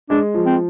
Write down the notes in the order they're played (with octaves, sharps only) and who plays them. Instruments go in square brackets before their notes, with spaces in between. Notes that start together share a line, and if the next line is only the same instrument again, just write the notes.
[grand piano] G#3 [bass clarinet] D4
[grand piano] F3
[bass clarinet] C4